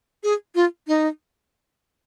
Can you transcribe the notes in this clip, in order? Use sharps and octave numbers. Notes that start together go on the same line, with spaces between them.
G#4
F4
D#4